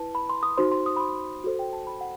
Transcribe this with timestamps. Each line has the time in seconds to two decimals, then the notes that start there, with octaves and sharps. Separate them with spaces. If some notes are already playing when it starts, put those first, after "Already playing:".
Already playing: E4 B4 A5
0.15 B5
0.30 C6
0.43 D#6
0.57 D#4 F#4 C5 C6
0.72 C6
0.86 D#6
0.96 B5
1.00 C6
1.44 F#4 A4 C5
1.59 G5
1.73 A5
1.87 B5
2.01 F#5